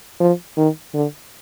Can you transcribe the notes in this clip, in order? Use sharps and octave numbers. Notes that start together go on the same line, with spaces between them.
F3
D#3
D3